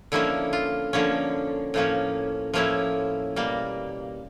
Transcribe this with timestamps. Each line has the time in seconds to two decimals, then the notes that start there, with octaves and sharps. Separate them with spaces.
0.12 D3 F3 A#3 C#4 E4
0.53 F4
0.93 D3 F3 A#3 C#4
1.74 A2 F3 A#3 C#4
2.54 A2 F3 A#3 C#4 E4
3.36 B2 G3 A#3